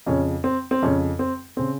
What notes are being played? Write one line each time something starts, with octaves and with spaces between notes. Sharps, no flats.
F2 C#3 C#4
C4
C4
F2 C#3 C#4
C4
C#3 C4